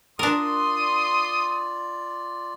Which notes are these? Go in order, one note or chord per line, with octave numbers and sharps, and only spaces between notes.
D4 F4 A#4 D5 C6 D#6